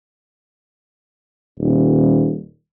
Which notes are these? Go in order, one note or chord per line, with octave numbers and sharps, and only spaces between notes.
D#1